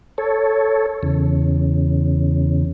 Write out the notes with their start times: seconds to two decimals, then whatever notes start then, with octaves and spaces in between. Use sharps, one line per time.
0.18 A4 C#5
1.03 E2 C#3